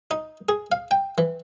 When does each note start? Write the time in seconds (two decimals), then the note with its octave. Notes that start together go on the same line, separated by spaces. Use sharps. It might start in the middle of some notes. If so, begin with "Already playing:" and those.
0.11 D#4
0.49 G#4
0.72 F5
0.91 G5
1.18 E3